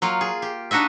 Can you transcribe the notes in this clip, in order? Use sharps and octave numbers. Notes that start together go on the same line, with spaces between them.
F#3 A#3 F4
G#4
G4
D4 D#4 F#4 D#5 E5